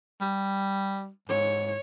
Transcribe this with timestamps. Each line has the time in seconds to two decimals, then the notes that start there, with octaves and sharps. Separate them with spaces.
0.21 G3
1.29 G#2 C#5